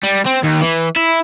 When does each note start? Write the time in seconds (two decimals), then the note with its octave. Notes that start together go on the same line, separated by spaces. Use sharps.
0.03 G3
0.26 C4
0.43 D#2
0.61 E3
0.96 E4